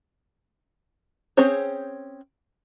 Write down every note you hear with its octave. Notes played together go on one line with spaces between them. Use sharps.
C4 C#4 G#4 C5 C#5